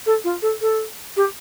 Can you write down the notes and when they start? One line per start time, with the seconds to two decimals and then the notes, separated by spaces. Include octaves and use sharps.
0.06 A4
0.24 F4
0.42 A4
0.61 A4
1.17 G4